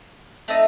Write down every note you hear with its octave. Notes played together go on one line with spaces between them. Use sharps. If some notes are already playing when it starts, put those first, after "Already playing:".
A3 C4 D#4